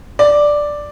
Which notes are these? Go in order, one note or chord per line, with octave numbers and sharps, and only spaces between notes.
D5